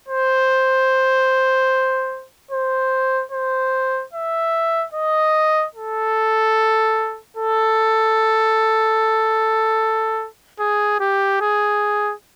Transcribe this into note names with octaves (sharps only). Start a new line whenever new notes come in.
C5
C5
C5
E5
D#5
A4
A4
G#4
G4
G#4